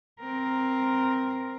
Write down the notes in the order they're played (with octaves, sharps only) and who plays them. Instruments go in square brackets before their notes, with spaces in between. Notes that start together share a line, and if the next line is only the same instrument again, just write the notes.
[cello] C4 A#4